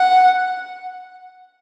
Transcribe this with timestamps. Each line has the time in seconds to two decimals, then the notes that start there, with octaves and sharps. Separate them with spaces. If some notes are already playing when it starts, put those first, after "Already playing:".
Already playing: F#5